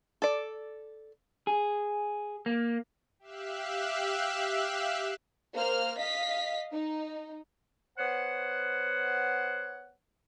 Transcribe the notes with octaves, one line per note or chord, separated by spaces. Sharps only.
A4 D5
G#4
A#3
G4 E5 F5 E6 F#6
A#3 C5 F6
D#5 F5 B6
D#4
B3 C5 C#5 F#5